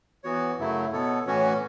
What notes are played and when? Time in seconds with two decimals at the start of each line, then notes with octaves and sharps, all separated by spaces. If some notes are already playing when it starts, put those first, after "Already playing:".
0.24 E3 B3 F#4 C#5
0.58 F#2 C#3 F#3 A3 E4
0.92 B2 B3 A4 C#5
1.26 A2 E3 C#4 F#4 C#5